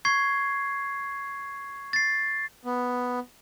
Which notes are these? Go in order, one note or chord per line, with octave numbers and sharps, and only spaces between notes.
C#6 G#6 C7
A6 C7
B3